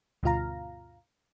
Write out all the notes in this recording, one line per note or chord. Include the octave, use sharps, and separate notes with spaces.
D2 G2 B2 F4 F5 A#5